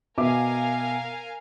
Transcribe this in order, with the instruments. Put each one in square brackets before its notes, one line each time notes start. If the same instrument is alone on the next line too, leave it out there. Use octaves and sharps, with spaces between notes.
[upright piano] B2 E5 D6 [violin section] A#4 F5 G#5